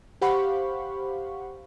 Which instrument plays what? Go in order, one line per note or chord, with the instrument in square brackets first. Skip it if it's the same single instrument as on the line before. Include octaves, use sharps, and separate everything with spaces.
[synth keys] G4 C5 F5 F#5 B5 C#6